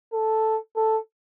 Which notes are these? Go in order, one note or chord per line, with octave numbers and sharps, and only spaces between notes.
A4
A4